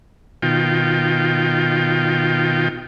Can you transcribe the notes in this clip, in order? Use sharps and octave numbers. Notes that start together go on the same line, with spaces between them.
B2 D#3 F4 G5